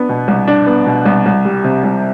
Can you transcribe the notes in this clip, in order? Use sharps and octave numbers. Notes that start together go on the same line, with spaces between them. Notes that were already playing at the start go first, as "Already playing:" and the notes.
Already playing: B3 D4
B2
C2
D4
B3
B2
C2
C2
G3
C3
C2